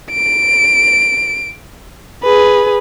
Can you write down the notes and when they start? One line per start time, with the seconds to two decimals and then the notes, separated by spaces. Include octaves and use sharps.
0.12 D7
2.23 G#4 B4